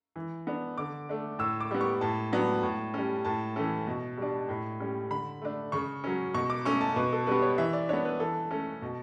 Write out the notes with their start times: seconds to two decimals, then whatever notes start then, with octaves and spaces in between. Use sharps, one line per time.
0.16 E3
0.47 B3 D4
0.78 D3 D6
1.09 A3 D4
1.39 A2 E6
1.60 D6
1.71 G3 B3
1.81 C#6
2.01 A2 A5
2.32 F#3 B3 D4
2.63 A2
2.94 G3 C#4
3.25 A2 A5
3.56 E3 A3 C#4
3.87 B2
4.18 G3 D4
4.49 A2
4.80 G3 C#4
5.10 D3 B5
5.42 A3 D4
5.72 C#3 C#6
6.04 F#3 C#4
6.34 B2 C#6
6.50 D6
6.65 A3 C#4 C#6
6.81 A5
6.96 B2 B4
7.12 A4
7.27 G3 B3 B4
7.42 C#5
7.58 E3 E5
7.73 D5
7.89 B3 D4 C#5
8.05 B4
8.20 E3 A4
8.51 A3 C#4
8.82 B2